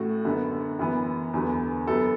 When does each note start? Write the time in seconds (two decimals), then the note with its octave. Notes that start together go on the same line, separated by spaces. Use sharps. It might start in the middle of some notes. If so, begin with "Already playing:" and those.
Already playing: A1 A2 A3 F#4
0.25 F#2 D3 B3
0.79 F#2 E3 B3
1.34 E2 D3 F#3 B3
1.87 F#2 F#3 B3 A4